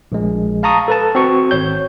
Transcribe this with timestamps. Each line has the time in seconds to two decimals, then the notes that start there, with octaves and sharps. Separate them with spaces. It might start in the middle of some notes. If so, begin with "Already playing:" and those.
0.12 A#1 G#3
0.63 F5 A5 A#5 C#6 D#6
0.88 A4 B4 A5
1.15 C4 F#4 C#6
1.51 G#1 C#5 G6